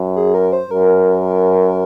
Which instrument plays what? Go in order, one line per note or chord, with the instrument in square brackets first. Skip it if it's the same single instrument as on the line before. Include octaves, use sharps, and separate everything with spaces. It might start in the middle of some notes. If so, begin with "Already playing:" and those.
Already playing: [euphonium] F#2
[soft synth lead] G#4
A#4
C5
[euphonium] F#2 [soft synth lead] A#4